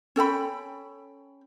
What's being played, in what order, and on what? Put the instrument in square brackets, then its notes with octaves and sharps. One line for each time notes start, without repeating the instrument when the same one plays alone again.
[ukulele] C#4 A4 G5 B5